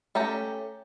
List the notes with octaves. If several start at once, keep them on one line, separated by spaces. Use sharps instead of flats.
A3 C#4 G4 A#5